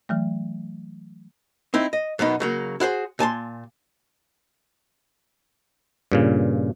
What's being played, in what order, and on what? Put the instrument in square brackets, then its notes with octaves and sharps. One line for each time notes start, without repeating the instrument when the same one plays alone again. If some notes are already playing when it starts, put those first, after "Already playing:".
[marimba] E3 F#3 A3
[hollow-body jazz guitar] C4 D#4 E4
D#5
F#2 B2 B3 D#4
C#3 F#3 A#3
E4 F#4 G#4 C5
A#2 G#5 A5 C6
[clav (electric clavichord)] G2 A#2 C#3